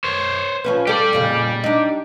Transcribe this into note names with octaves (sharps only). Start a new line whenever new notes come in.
C5 C#5
F3 C#4 B4
G3 G4 A4 D5
F2 A#2 C#3
D4 D#4